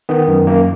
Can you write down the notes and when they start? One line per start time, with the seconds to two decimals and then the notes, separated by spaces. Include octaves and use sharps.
0.09 D#3 B3
0.28 F#2
0.47 F#2 A#3